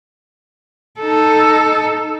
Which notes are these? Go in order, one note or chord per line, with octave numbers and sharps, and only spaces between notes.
D#4 A4